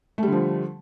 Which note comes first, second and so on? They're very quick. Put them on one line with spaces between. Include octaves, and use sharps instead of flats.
A3 G3 D3 F3